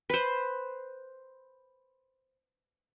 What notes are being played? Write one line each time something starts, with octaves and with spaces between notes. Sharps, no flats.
B4 C5